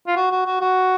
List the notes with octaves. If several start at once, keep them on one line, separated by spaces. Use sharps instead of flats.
F4
F#4
F#4
F#4
F#4